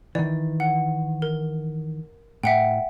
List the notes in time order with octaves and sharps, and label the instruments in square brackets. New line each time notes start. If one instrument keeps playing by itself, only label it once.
[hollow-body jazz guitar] D#3 E3 [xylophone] D5
[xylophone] F#5
A#4
[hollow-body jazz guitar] A2 [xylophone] E5 F#5 G5